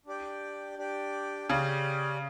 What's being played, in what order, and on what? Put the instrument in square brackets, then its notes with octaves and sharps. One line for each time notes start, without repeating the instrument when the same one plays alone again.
[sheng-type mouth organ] D4 G4 D5 G5
D4 G4 D5 G5
[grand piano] C#3 [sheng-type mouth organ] C#4 G4 D5 G5